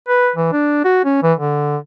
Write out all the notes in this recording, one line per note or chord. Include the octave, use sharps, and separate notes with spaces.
B4
E3
D4
F#4
C#4
E3
D3